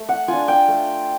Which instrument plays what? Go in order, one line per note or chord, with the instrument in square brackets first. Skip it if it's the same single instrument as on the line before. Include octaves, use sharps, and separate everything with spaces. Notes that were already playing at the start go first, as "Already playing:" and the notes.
Already playing: [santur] A3
F#5
D4 F4 G#5
G5
A3